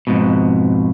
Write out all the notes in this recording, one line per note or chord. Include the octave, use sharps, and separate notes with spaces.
F2 G#2 B2